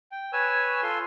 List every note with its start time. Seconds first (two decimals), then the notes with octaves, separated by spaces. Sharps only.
0.12 G5
0.33 B4 C#5 G#5 E6
0.83 F4 A4 C6